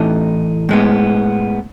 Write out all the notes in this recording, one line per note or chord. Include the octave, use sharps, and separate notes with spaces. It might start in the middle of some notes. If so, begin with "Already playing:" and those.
Already playing: A2 E3 A3 D#4
A2 G#3 B3